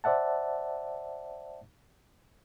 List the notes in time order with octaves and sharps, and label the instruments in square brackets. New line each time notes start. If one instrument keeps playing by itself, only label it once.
[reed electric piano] C5 D5 E5 F#5 A5